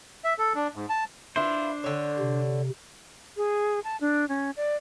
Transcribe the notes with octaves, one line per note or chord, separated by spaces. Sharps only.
E5
A4
D4
G#2
A5
D4 E4 F4 B4 C5
D3 C#5
C3
G#4
A5
D4
C#4
D5